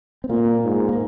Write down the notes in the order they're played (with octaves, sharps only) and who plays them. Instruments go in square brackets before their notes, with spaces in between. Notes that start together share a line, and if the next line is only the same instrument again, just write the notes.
[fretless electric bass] C4
[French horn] A#2 [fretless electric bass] A#3
[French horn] G#2
[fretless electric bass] A#3